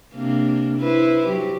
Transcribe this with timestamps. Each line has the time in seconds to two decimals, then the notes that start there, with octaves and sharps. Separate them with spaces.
0.14 C3 A#3 D4
0.78 E4 B4 C5
1.26 F#3 G4